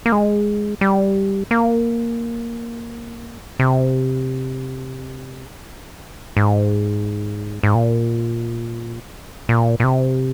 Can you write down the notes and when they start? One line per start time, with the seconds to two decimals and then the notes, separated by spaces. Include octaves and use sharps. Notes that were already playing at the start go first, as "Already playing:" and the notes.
0.06 A#3
0.12 G#3
0.81 G3
1.51 A#3
3.60 C3
6.37 G#2
7.63 G#2
7.75 A#2
9.49 A#2
9.80 A#2
9.84 C3